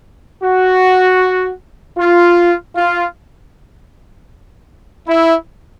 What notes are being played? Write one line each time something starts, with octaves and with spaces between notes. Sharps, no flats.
F#4
F4
F4
E4